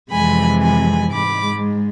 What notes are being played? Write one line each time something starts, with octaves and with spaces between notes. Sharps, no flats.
F2 C3 E3 G#3 G#5 B5
G#5 B5
G#2 G#3 B5 D6